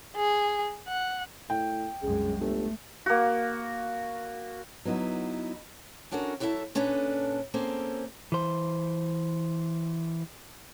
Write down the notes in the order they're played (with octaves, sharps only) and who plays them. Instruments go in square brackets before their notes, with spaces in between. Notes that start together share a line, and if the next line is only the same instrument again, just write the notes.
[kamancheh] G#4
F#5
[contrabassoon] A2 [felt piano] G5
[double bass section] C2 F#2 G#3 [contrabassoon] C#3
[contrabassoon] G1 [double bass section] A3
[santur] A#3 F#4
[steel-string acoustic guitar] F#3 B3 D#4 E4
C#4 D4 F#4 A4 A#4
F#3 E4 A4 A#4 E5 A5
A#2 C#4 D4 A4 B4
A#3 C4 C#4 G#4 A4
[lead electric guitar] E3 C5